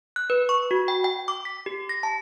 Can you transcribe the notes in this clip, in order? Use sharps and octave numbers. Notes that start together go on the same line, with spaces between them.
F#6
B4
C#6
F#4
G5
G5
D6
B6
G4
A#6
A5